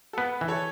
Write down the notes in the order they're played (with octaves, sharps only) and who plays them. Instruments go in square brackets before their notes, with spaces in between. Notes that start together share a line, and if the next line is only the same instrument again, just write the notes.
[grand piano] A4
[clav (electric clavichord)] B3 [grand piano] B4
[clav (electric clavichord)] E3
[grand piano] A4 C#5